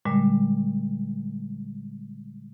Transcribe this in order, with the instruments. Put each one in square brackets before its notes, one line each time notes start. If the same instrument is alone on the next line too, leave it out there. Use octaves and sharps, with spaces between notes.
[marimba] A#2 D3 G3 G#3